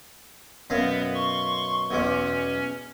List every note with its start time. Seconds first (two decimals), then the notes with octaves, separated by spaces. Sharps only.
0.70 F#2 B2 B3 F5
1.14 C6 C#6
1.91 B1 E2 C#4 D6